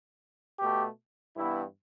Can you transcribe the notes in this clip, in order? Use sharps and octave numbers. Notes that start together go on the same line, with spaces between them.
B2 A3 G4
G2 E3 B3 E4